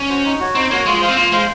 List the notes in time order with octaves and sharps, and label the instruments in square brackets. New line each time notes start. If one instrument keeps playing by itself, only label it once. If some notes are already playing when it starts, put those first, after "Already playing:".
Already playing: [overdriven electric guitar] C#4
[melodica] F#4 C5
D#4
F#4 C#5
[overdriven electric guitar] C4 [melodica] D#4
[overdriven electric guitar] A#3 [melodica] F#4 C#5
[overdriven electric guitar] G#3 [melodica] F4
[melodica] C5 F5
[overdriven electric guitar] C4
[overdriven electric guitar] A#3 [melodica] F4
[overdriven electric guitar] G#3 [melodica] C5 F5